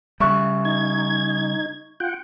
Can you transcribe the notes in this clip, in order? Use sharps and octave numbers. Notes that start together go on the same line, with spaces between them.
C#3 G3 E5 C#6 F#6
D#4 G#6
F4 F#5 G5